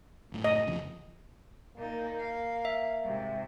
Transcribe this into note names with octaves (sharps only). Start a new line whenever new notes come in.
F#1 A2
D#5
F2 C#3 F3
A#2 A#3 D#4
F5
E5
G#2 C3